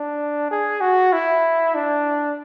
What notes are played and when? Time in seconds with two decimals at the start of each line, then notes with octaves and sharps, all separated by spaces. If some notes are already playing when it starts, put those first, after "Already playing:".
Already playing: D4
0.51 G#4
0.81 F#4
1.13 E4
1.75 D4